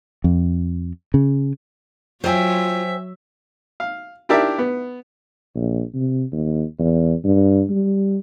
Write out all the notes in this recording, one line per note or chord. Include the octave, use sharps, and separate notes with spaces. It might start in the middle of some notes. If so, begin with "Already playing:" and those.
F2
C#3
F#3 F4 C5 E5 G5 G#5
F5
D4 E4 G4 A#4 D5 E5
B3
A#1
C3
D#2
E2
G2
G3